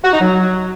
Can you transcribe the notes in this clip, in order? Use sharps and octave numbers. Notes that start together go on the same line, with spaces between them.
F#4
D#4
F#3